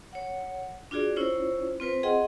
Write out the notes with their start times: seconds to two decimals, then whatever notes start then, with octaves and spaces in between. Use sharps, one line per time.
0.13 C#5 F#5
0.91 D4 F4 F#4 G#4 D5
1.16 C#4 E4 F4 C5 C#5
1.80 C4 F4 B4 C5
2.03 G#4 D#5 F#5 G5 C6